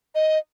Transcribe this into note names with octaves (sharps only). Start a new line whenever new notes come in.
D#5